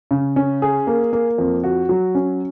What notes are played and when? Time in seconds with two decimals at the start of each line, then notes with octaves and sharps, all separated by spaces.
0.11 C#3
0.36 C#4
0.62 G#4
0.87 A#3
1.13 A#3
1.38 F2
1.64 F#4
1.89 F#3
2.15 C#4